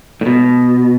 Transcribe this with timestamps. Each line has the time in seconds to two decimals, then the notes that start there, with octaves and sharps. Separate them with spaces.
0.21 A2
0.26 B2